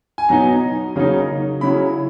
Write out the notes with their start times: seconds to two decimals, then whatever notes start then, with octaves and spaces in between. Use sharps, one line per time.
0.18 G#5
0.29 B2 F#3 B3 D#4 A#5
0.96 C#3 F#3 A#3 D#4
1.61 C#3 F#3 C#4 E4 B5